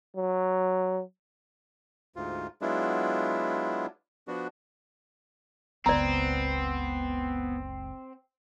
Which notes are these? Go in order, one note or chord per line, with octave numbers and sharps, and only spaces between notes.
F#3
D2 G#2 F4
F#3 G#3 B3 D4 E4 F4
F3 B3 D4 F#4
F#1 C#2 B3 C4 D5 A#5